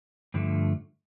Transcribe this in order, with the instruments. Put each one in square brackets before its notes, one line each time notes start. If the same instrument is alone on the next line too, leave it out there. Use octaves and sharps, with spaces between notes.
[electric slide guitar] G2 D3 F3 A3